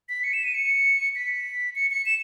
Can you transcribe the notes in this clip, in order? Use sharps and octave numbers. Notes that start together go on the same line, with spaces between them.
B6
C#7
E7
D#7
C#7
B6
C#7
C#7
E7